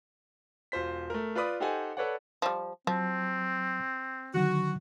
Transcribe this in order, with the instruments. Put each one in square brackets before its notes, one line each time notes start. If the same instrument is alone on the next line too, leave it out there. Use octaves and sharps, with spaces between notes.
[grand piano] E1 F4 C5 B6
A3 A#4
F4 B4 D5 B5 D#6
D#4 G4 A4 C5 F#5 G#5
A4 B4 C#5 D5 F#5
[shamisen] F3 G3
[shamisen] F3 [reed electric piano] F#3 [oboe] C4
[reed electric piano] D3 D#3 F#3 [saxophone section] F#4